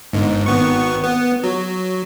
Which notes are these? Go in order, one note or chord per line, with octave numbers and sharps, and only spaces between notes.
G1 G#2
G#1 B3 C#6
B3
F#3